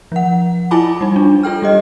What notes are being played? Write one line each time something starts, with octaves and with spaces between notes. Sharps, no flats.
F3 F#5
E4 F4 G#5 A5 B5 D6
G3 D#4
D4
F4 A4 G5 F6
G3 G4 D#5